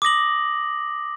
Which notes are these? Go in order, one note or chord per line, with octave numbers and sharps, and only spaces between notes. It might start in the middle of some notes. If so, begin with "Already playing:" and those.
D6 D#6 A#6 F#7